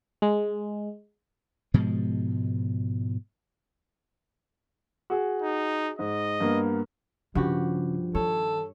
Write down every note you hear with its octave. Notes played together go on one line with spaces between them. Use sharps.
G#3
G#2 B2 F3 G#3
F#4 G#4
D#4
G#2 D#5
G2 A#3 B3
G2 C#3 F3 F#4 G4
D#3 A4 C#5